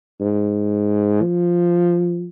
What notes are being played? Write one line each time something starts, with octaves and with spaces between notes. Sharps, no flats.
G#2
F3